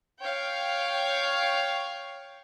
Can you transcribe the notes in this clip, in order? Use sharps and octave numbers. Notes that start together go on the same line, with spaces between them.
C#5 F5 G5